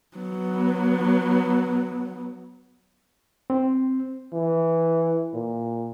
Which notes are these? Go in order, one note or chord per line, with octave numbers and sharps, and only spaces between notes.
F#3 B3
C4
E3
A#2